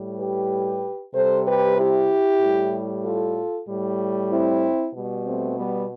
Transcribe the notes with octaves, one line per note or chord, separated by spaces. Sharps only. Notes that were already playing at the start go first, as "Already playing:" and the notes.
Already playing: A2 G3
G4 B4
C3 G3 A4 C5
G4 B4
E4 G4
A2 G3
F4 A4
A2 G3
C4 E4
B2 G3
A3 C4
G3 B3